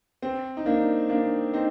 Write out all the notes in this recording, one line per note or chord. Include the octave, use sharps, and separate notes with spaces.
C4
D#4
A#3 D4
A#3 D4
C4 D#4